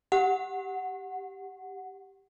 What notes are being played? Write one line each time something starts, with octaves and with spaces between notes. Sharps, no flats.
G4 F#5